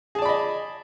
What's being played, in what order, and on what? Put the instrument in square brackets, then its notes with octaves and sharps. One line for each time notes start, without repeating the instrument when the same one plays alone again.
[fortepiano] G#4
A5
D5
B5
D#5